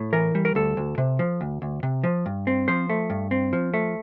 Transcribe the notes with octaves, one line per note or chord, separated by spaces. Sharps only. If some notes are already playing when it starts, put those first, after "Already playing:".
Already playing: A2
E3 A#4
G3
A#4
D2 A4
D2
C3
F3
D2
D2
C3
F3
G2
C4
F3 C5
A3
G2
C4
F3
A3